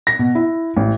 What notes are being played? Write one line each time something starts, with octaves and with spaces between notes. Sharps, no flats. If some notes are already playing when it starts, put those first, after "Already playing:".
A#6
B2
E4
A1